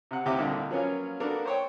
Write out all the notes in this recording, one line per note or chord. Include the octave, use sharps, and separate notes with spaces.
C3 F#5
D#2 C3 E4 G4 D6
C2 A#2 D3 D#5
F3 F#3 A#3 B3 C#4 F4
A#3 B3 D4 F#4 A4 A#4
C5 C#5 G5